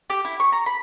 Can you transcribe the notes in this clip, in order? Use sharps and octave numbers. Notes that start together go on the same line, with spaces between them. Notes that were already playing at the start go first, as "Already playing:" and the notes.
G4
E4
C#6
A#5
B5